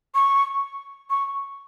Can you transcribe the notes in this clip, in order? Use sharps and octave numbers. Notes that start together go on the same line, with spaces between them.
C#6
C#6